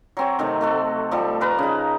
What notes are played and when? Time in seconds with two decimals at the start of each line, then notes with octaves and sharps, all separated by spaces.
0.17 F#3 C4 C#5
0.39 C3 D#3 F#3 A3
0.61 A3 F#4 A4
1.11 F3 G3 A3 A4
1.41 A#4 B4 A5 A#5
1.58 C#3 D#4